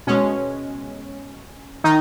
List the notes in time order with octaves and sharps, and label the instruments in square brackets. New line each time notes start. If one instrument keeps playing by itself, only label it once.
[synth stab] B2 G#3 C#4
D#3 D#4